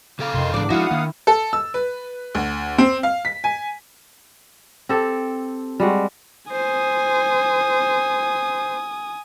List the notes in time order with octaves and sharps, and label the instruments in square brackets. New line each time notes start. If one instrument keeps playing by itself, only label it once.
[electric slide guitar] C#3 A4 F5 [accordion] D6
[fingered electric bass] F2 C3 [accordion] D#3 C6
[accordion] E2 D6 [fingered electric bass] G#2 E3 G#3 [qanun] D4 D5
[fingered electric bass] F3 G#3 [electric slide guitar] D#4 F#4 [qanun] E4 [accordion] F5 F#5 D#6
[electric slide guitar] D#3 [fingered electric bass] A#3
[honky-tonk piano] A4
E6
B4
D2
C4
F5
B6
G#5
[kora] C4 G4 A4
G3 G#3 F#4
[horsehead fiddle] C5 [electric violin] G#5 D#6